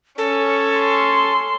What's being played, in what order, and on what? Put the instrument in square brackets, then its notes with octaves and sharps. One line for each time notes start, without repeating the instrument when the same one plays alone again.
[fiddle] C#4 [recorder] A4
[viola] C6